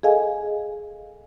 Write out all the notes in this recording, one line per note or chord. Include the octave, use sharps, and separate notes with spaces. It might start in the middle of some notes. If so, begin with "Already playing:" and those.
G#4 A4 D#5 F5 G#5